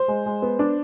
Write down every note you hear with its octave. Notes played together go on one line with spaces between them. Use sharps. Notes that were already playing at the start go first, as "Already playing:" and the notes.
Already playing: C5
G#3
G#3
B3
D4